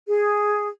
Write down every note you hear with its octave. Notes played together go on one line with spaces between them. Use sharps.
G#4